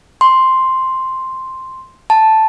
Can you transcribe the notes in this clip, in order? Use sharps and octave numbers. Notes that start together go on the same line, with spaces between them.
C6
A5